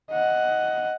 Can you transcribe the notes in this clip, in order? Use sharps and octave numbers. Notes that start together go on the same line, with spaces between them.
D#5 F#5